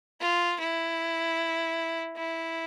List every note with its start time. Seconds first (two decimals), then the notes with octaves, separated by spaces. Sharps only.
0.20 F4
0.59 E4
2.16 E4